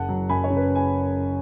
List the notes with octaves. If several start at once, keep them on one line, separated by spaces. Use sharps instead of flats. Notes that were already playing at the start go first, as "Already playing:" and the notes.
Already playing: F#1 F#5 A5
F#3
F#2 G#5 B5
C#5
C#3
B4
G#5